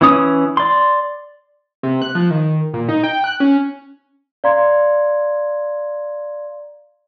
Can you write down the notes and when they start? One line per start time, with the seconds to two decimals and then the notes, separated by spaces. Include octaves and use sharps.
0.01 E3 C#4 D#6
0.57 D5 C6
1.83 C3
2.02 F#6
2.15 F3
2.31 D#3
2.74 A#2
2.89 D#4
3.04 G5
3.24 F#6
3.40 C#4
4.44 D5 F5 A#5 C6 G#6